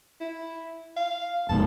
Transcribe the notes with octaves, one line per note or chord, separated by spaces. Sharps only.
E4
F5
F1 G#2 B2 A5